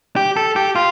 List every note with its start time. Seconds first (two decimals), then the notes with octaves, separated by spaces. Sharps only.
0.16 G4
0.37 A4
0.56 G4
0.75 F4